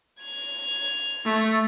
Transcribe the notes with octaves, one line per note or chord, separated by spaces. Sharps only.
G#6 F7
A3